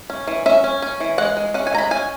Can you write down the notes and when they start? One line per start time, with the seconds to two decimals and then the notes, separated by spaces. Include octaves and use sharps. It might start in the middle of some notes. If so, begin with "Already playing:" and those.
0.10 C#4
0.27 E3
0.46 C#4 E5
0.64 C#4
0.82 C#4
1.00 E3
1.18 G#3 F#5
1.37 G#3
1.54 C#4 F#5
1.67 G#5
1.72 G#3 A#5
1.78 B5
1.91 C#4 G#5